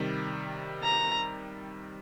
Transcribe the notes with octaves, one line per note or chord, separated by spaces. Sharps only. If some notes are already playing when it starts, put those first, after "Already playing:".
Already playing: C3 D#3 G3
A#5